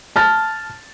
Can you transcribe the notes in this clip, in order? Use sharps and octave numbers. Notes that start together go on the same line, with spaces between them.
A5 F6 A6